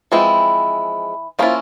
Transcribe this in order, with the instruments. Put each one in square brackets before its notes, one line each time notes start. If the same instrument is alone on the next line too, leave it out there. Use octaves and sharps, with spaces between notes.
[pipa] E3 E4 [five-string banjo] F3 G#3 C4
[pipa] F3 F4 [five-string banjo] A#3 C#4 E4